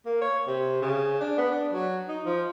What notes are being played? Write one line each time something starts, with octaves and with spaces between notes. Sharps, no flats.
A#3
C#5
C3
C#3
D4
B3
D4
F#3
D#4
F3